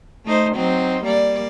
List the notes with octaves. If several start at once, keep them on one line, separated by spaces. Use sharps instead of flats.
A3 D#4 C5
F#3 C4 D#4
G3 A#3 D5